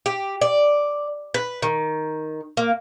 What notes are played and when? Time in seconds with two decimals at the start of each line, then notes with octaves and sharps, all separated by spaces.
0.06 G4
0.41 D5
1.34 B4
1.62 D#3
2.57 A#3